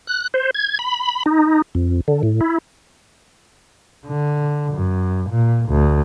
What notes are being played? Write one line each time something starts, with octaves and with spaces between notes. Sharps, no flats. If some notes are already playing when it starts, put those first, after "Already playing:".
F#6
C5
G#6
B5
D#4
F2
D3
A2
E4
D3
F#2
A#2
D2